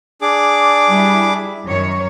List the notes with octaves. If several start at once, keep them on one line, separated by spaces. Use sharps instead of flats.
D4 G#4 D6
G3 E4
F#2 D#3 C#5